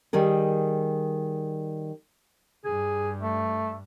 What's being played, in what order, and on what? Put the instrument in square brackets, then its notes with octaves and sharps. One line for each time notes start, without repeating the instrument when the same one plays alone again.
[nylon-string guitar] D#3 G3 G#4 A#4
[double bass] G2 [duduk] G#4
[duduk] A3